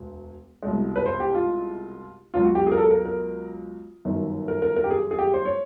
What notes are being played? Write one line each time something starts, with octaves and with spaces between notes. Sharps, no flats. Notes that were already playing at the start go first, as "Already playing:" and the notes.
Already playing: E1 D2
C2 B2 G#3
B4
C5
G4
F4
C#2 B2 F#3 F4
F#4
G4
G#4
A#4
A4
A#4
A#4
G1 F#2 D#3
A#4
A#4
A#4
G4
G#4
G#4
G4
C5
C#5